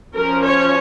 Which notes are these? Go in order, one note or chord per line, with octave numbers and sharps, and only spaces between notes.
F3 C#4 A#4
C#5